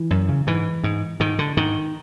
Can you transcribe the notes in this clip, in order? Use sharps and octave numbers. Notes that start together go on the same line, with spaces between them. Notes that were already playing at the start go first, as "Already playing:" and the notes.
Already playing: E3
F#2
C#3
G#2 E3
G#2
G#2 D#3
D3
G#2 D#3